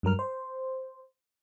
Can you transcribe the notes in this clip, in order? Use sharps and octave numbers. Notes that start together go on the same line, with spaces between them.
G2 F#3 A#4 F6
C5